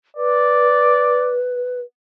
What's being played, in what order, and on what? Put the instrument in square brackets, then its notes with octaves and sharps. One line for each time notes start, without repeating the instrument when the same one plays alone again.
[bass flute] B4 [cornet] D5